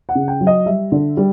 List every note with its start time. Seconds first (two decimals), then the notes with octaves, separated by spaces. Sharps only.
0.09 F#5
0.15 C#3
0.28 G5
0.41 F#3
0.47 D#5
0.66 G3 E5
0.92 D3
1.17 G3